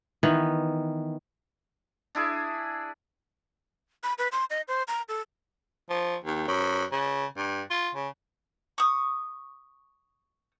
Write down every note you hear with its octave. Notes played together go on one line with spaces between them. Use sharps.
D#3 E3 B3
D4 E4 G#4
B5
B4
C6
D#5
C5
A#5
A4
F3
D#2
F#2
C#3
G2
F4
C#3
C#6 D#6